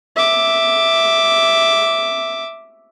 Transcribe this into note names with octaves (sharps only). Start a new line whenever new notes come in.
E5 D6